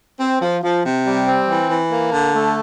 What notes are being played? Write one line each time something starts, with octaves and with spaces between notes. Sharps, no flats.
C4
F3
F3
C3
G3
C4
E3
E3
A#3
D3
A3